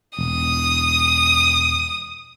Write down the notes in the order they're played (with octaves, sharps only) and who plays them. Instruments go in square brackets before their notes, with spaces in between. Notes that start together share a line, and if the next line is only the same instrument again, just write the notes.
[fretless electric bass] E1 [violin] D#6